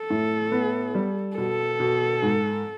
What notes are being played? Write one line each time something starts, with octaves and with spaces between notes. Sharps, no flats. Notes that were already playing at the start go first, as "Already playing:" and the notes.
Already playing: A4
A2
B3
G3
B2 A4
B2
G#2